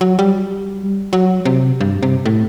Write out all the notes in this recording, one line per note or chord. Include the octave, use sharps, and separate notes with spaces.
F#3
G3
F#3
C3
G2
C3
A2